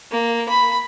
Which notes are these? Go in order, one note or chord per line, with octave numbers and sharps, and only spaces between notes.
A#3
B5